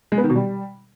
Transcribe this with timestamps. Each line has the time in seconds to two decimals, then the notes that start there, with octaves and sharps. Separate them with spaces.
0.12 G#3
0.18 B3
0.24 D#3
0.30 B2
0.35 G3